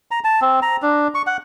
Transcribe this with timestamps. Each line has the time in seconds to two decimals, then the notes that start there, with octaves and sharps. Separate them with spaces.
0.11 A#5
0.24 A5
0.42 C4
0.62 A#5
0.82 D4
1.15 C#6
1.27 F#5